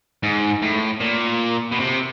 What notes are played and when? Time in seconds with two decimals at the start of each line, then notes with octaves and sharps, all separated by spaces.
0.23 G#2
0.62 A2
1.01 A#2
1.72 B2
1.80 C3